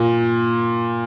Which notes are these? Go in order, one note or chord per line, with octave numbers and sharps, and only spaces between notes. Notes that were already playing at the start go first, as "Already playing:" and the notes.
Already playing: A#2